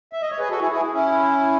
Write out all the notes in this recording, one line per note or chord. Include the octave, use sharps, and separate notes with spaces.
E5
D#5
C#5
G#4 B4
F#4 A4
E4 G#4
E4 G#4
C#4 E4